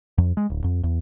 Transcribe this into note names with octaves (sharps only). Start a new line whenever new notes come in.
F2
G#3
D1
F2
E2